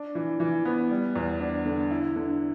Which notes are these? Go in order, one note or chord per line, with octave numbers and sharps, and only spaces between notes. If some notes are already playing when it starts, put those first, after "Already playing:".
Already playing: D4
E3
E3
B3
G3
E2
D4
D3
E4
D3